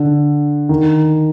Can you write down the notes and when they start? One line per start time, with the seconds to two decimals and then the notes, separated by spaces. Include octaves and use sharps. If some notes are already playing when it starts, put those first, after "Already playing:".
Already playing: D3
0.69 D#3